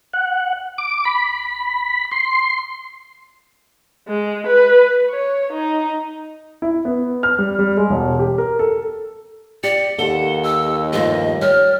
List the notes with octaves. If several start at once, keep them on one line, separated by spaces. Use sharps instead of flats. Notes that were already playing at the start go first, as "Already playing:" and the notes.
F#5
D6
B5
C6
G#3
B4
C#5
D#4
E4
B3
F6
G3
G3
G#3
E1
G4
A#4
A4
G4 D5 C#7
D#2 G4 A4 F#5 G7
E6
G2 F3 A3 D#5
G3 C#5 F6